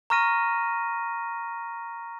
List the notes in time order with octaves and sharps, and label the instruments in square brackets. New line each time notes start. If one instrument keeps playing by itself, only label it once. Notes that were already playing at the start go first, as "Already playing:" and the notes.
[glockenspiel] A#5 C#6 F6 A#6 D#7